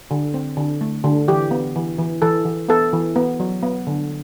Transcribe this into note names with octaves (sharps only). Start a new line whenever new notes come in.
D3
C4
D3
A3
D3
E3 G4
B3
E3
E3
E3 A4
E3
B3 A4
E3
B3
F#3
B3
D3